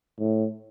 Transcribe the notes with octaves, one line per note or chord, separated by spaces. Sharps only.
A2